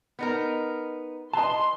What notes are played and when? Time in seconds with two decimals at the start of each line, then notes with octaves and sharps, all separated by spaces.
0.19 B3 D#4 A#4
1.34 E3 D#5 A5 C6